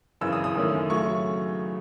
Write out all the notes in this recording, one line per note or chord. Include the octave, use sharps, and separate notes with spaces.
G#1 F#2 C#3 E3 E6
D#6
D#6
F#2 D#3 A3 C#4
C#3 F#3 A3 C#6